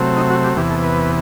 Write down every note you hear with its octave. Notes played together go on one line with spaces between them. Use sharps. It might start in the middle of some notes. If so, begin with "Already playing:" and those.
Already playing: C3 F#3 A3 C4
D#4
F#4
G4
E2 C3 E3 B3 G4
A4
B4